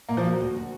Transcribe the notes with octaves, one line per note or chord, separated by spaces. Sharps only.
A#2 A#3
F3
F#3 A#3
D2
F#4